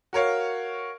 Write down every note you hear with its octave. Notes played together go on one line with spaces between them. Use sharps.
F#4 A#4 C#5 F5